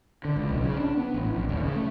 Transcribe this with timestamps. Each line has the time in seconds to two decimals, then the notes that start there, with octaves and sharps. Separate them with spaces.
0.25 D3
0.37 C#2
0.50 B1
0.64 C#3
0.80 D4
0.97 B3
1.14 A1
1.33 A#1
1.49 D#1
1.63 C#3
1.76 A3